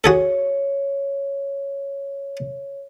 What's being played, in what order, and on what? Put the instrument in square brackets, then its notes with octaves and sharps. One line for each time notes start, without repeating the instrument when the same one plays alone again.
[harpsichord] F#4 G#4 A4 [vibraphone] C#5